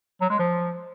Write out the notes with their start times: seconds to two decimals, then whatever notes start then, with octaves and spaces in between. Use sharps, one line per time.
0.21 F#3
0.30 G#3
0.39 F3